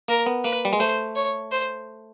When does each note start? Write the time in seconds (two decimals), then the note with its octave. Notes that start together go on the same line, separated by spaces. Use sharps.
0.08 A#3 A#4
0.26 B3
0.44 A#3 B4
0.65 G3
0.73 G#3
0.80 A3 C5
1.15 C#5
1.51 C5